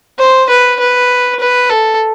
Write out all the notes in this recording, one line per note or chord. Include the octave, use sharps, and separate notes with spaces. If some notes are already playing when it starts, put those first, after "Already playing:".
C5
B4
B4
B4
A4